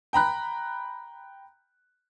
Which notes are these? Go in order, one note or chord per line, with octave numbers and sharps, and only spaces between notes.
G5 A#5 B5 F#6